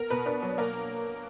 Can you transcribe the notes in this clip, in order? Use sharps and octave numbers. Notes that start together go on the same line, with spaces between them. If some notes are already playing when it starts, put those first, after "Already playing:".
Already playing: B3 A#4
B2 B4
D4 B4
F#3
A#3 A#4